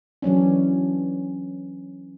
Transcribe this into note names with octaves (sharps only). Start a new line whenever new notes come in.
E3 F#3 C#4 D4